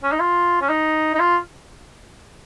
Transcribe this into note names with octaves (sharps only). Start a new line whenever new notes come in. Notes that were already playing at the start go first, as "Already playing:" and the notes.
C#4
D#4
F4
C#4
D#4
D#4
F4